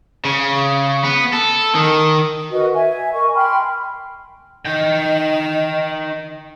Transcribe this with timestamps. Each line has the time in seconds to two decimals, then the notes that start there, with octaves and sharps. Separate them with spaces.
0.25 C#3
1.04 B3
1.33 A4
1.75 D#3
2.51 F#4 A#4 B4 D#5
2.73 E5 G#5
3.13 A#4 D#5 G#5 C#6
3.35 G5 B5 C6 F6
4.66 D#4 D#5 G5